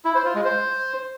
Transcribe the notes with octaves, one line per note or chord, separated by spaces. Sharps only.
E4
C5
F4
G#3
C5